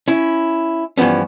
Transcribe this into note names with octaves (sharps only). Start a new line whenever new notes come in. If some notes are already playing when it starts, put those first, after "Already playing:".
C#4 E4
G2 E3 F3 B3 C#4